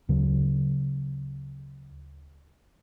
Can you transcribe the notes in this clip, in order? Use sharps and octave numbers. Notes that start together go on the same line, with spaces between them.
D2 C#3 F#3